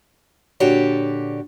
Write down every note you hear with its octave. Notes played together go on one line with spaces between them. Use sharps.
A#2 D3 F#4 G4 C#5 D5